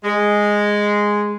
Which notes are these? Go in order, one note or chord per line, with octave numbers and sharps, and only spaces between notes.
G#3